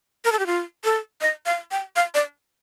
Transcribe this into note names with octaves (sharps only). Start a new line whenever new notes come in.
A#4
A4
G4
F4
A4
D#5
F5
G5
F5
D5